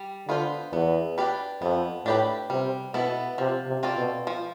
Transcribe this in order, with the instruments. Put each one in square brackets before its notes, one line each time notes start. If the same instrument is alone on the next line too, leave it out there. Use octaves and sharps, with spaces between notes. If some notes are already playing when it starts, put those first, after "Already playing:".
Already playing: [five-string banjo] G3
[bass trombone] D3 [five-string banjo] B3 F4 C5
[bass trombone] E2 [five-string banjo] B3
[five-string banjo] D4 G4 B4
[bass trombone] F2 [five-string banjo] B3
[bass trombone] A2 [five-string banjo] D4 G4 B4
[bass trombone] C3 [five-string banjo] G3
[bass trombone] B2 [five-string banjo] B3 E4 A4
[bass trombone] C3 [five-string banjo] F3
[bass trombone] C3
[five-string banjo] C4 F4 A4 D5
[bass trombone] B2
[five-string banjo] F3